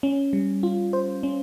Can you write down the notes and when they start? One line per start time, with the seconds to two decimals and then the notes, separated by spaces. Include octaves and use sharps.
0.03 C#4
0.33 G3
0.63 F4
0.93 C5
1.23 C#4